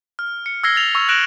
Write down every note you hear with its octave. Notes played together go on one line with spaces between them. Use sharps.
F6
C#7
E6 F6 G#6 A#6 C7 G7
A6 C7 F7
C#6 E6
F#6 A#6 D7 E7 F#7